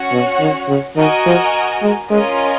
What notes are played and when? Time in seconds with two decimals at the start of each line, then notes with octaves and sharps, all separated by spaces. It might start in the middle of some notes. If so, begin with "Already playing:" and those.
Already playing: C#4 F#4 C#5 F#5
0.12 B2
0.40 D#3
0.68 C#3
0.97 D#3 F#4 A#4 D#5 G#5
1.26 F3
1.83 G#3
2.11 G#3 C#4 F4 A#4 D#5 G#5